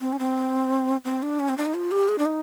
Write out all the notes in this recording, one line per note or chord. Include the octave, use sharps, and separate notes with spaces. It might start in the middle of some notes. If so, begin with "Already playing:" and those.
C4
C#4
C4
C4
D4
C#4
C4
D4
D#4
F4
G4
G#4
D4
D#4